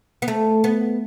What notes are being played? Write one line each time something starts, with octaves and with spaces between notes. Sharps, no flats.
B3
A3
B3